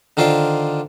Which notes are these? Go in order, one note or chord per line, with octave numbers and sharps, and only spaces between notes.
D3 D#3 F4 C5 D5